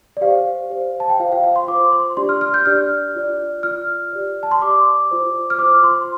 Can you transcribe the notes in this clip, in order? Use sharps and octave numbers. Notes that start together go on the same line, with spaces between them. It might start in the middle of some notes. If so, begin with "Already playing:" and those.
D5
G4 C5 F5
G4 C5
A5
G5
F4 C5 F5
F5
F5
C6
F4 C5 D6
C6
D4 G4 D5 C6
F6
F6
G6
D4 G4 D5 F6
F4 D5
F4 D5 F6
G4 D5
A5
C6
G4 D5 D6
F4 C5
F6
F4 C5 D6
C6